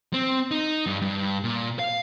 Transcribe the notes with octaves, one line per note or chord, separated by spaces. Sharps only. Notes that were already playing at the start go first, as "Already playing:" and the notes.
C4
D#4
G2
G2
A#2
F5